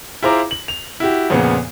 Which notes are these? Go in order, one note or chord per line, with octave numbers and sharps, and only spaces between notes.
E4 F4 G#4 C5 A#5 D6
F#7
F7
E4 F#4 G4
F2 A#2 C#3 B3